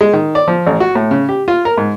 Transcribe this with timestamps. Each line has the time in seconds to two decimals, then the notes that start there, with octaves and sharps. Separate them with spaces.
0.01 G#3
0.13 D#3
0.35 D5
0.48 F3
0.67 A1
0.80 F#4
0.95 A2
1.11 C#3
1.29 G4
1.48 F4
1.65 A#4
1.77 G#2